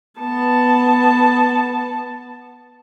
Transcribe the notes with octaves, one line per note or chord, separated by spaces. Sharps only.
B3 A5